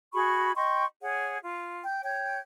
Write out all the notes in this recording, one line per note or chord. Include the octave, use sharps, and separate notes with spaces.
F#4 G#4 B5 C#6
D#5 G5 C6 C#6
G#4 C#5 F#5
F4
G5
C#5 G5